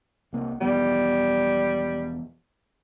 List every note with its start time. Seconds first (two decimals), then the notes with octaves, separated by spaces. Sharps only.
0.33 C2 A#3 C4
0.61 E1 F3 G3 B3